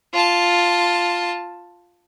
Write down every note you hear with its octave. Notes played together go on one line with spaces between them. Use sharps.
F4 A5